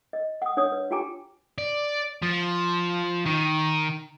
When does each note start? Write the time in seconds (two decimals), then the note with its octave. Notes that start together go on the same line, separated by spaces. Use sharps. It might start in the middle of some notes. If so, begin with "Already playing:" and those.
0.13 D#5
0.42 F#5 D#6
0.57 D4 C#5 F#5 D#6
0.72 B4
0.91 F4 G4 G5 G#5 A#5 D6
1.58 D5
2.22 F3
3.26 D#3